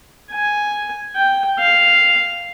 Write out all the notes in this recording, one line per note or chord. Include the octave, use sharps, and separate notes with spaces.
G#5
G5
F5